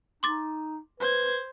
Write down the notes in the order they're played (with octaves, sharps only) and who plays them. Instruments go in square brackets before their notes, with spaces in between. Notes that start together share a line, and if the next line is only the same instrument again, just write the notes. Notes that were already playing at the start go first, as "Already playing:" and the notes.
[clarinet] D#4 [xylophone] C6 D6 A6
[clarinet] B4 [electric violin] C5 G#6